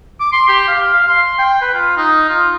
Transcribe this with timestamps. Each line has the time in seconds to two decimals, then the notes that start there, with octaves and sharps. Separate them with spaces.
0.20 D6
0.32 C6
0.48 G4
0.68 F5
0.94 F5
1.09 C6
1.39 G5
1.62 B4
1.74 F4
1.97 D#4
2.29 F4